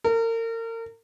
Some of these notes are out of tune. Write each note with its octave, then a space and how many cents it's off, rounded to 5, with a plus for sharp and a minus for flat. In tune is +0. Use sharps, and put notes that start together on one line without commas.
A#4 -35